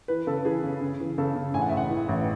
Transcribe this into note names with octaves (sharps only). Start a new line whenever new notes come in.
E3 B4
C#3 A4
E3 G#4
C#3
C#3
E3
C#3 A4
C#3
A1 G#5
F#5
A1 E5
F#5
E3
A1